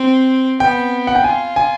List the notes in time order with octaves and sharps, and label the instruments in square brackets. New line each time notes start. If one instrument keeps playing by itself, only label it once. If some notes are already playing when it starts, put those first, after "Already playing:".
Already playing: [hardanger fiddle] C4
[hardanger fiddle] B3 [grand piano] G5
[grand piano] F#5
G5
[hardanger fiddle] F4 [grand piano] G#5
[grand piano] G#5